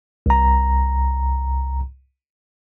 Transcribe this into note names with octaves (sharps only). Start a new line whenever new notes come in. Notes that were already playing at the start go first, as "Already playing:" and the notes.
C2 A#5